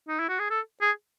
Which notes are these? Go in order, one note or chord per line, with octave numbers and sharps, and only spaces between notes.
D#4
E4
F#4
G#4
A4
G#4